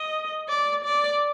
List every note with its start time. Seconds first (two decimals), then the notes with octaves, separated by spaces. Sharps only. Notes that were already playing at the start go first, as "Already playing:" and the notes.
Already playing: D#5
0.49 D5
0.84 D5